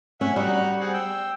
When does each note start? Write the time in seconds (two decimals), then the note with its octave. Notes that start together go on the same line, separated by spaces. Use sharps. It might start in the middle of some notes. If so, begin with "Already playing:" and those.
0.21 C#4 E5 F#5
0.36 G3 D#4 F#4 F#5
0.81 C4 G#4 F#5
0.94 G5 E6